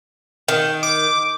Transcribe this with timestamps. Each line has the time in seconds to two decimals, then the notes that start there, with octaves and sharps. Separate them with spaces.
0.48 D#3
0.83 D6